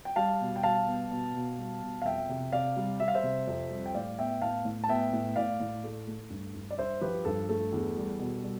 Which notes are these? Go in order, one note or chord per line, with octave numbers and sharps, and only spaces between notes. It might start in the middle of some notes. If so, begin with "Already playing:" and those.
G5
G3 F5 A5
B2
G5
G3 F5 A5
B3
B2
B2
G3
B2
F5
F2 E5 G5
C3
C3 D5 F5
G3
G3 E5
F5
C5 E5
C3
F2
G3
G5
A2 D5 F5
B3 E5 G5
A2 F5 A5
A2
A5
B3 E5 G5
A2
A2 D5 F5
A2
A3
A3
G2
G2
D5
G2 C5 E5
F3 G4 B4
G2 A4
A3 A4
E2
G3
B2
G3